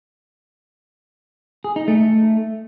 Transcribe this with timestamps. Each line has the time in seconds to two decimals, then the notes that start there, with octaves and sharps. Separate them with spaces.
1.64 G#4
1.76 D#4
1.88 A3